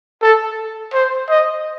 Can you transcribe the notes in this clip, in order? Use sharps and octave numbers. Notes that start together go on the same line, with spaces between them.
A4
C5
D#5